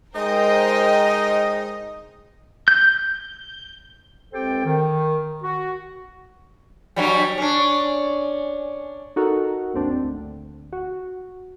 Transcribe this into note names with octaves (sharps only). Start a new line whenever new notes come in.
G#3 D#4 A#4 C5 D#5 G5
G6
C#2 C4 G4 A4 C5 G5
D#3
F#4
G2 F#3 G3
C#4 D4
D#4 F#4 A4 A#4
G#1 D#2 C4 D4
D2
F#4